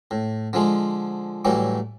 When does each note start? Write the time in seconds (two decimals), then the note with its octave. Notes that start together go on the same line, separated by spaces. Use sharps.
0.11 A2
0.53 D3 F3 G#3
1.45 A2 E3 F#3 G3